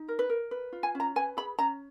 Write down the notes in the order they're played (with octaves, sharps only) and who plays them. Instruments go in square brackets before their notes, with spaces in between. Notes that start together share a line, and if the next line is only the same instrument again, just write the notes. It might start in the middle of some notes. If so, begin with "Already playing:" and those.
Already playing: [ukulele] D#4
A#4
B4
A#4
B4
F4
G#5
C#4
A#5
B4 G#5
G#4 B5
C#4 A#5